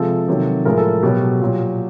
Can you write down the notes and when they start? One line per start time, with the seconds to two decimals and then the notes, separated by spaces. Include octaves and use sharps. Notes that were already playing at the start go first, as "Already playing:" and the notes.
Already playing: C3 F3 G#3 A4
0.28 C3 D#3 F#3
0.65 A2 F3 G#3 A#4
0.78 A4
1.03 B2 F#3 G4
1.41 A#2 F#3